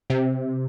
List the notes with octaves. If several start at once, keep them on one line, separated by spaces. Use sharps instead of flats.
C3